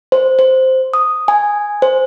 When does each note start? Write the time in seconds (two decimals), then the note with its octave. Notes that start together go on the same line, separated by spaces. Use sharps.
0.12 C5
0.39 C5
0.94 D#6
1.28 G#5
1.82 C5